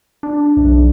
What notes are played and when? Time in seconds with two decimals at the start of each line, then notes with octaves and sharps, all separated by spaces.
0.23 D4
0.57 B1